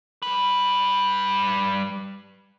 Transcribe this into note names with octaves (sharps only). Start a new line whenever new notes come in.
G3 B4